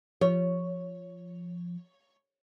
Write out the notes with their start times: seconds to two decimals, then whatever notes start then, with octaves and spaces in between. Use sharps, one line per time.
0.21 F3 C#5